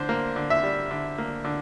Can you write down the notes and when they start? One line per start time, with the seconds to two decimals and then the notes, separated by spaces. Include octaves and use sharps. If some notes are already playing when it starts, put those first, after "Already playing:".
Already playing: D3 C5
0.09 A#3
0.36 D3
0.50 E5
0.63 G3
0.91 D3
1.18 A#3
1.44 D3